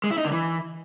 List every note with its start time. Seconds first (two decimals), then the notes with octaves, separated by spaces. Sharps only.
0.04 G#3
0.11 E4
0.18 D#4
0.25 D3
0.32 E3